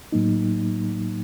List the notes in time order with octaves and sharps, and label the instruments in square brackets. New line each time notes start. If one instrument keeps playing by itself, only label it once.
[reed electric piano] A2 F#3 A#3 D#4